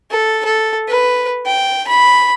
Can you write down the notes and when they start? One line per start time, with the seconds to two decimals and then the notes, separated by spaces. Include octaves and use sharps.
0.11 A4
0.45 A4
0.89 B4
1.46 G5
1.87 B5